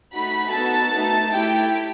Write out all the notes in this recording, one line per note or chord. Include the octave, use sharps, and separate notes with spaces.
A3 D#4 F#4 B5
B3 D#4 F#4 A4 A5
A3 D#4 A4
A3 E4 G4 G5